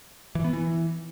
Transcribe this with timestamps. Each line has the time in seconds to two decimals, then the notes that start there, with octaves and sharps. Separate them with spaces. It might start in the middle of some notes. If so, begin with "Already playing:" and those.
0.35 E3
0.44 B3
0.53 E3